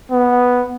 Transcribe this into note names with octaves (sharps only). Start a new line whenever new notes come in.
B3